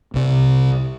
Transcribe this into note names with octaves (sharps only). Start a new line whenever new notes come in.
C2 C3